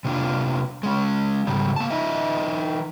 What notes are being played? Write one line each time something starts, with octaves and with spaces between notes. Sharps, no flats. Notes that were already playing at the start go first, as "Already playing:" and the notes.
C3 A#3 D4 F4
G#3 C#4
G#2 C#3 G3
A#3 A5
E3 D#4 D#5 E5